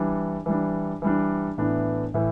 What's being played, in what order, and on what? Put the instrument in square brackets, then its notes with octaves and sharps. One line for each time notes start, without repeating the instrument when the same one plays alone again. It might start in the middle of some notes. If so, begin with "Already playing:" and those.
Already playing: [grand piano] E3 G3 D4
E3 G3 D4
E3 G3 D4
A2 E3 B3 D4
A2 E3